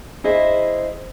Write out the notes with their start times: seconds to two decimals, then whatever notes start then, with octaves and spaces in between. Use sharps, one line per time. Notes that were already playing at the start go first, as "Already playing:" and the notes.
0.24 E4 G#4 C5 D#5 E5